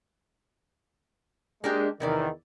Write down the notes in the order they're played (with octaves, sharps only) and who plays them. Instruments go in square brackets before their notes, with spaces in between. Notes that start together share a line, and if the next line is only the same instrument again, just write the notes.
[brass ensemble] G#3 [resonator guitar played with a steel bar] A#3 D4 G4
[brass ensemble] E2 D#3 [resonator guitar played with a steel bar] C3 E4 D5